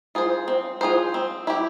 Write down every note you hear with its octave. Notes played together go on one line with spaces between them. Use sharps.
F4 G#4 C5
C4
F4 G#4 C5
C4
E4 G4